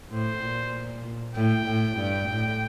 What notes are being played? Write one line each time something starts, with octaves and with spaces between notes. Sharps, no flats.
A2 C5
A#2
A2 G5
A2
G2
A2